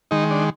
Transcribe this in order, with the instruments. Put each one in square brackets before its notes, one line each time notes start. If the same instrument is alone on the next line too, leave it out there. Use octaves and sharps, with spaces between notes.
[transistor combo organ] D#3 G#3 D#4
D4